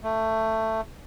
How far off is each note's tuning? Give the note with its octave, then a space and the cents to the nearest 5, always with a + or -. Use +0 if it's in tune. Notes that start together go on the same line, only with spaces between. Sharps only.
A3 +15